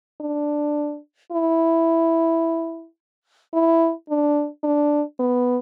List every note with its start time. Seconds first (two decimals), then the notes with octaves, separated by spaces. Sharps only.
0.21 D4
1.32 E4
3.54 E4
4.09 D4
4.64 D4
5.20 B3